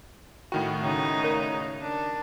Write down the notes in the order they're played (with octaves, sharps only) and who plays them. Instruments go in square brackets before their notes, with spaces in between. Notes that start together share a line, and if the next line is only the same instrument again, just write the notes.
[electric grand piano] A2 D#3 F#4 [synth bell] G5
[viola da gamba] C#3 D#4
[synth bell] A#4
[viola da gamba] D4